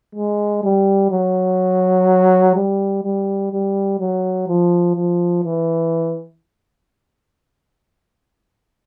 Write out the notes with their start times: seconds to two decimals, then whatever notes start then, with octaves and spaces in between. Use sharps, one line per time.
0.15 G#3
0.63 G3
1.11 F#3
2.56 G3
3.04 G3
3.52 G3
4.00 F#3
4.48 F3
4.96 F3
5.44 E3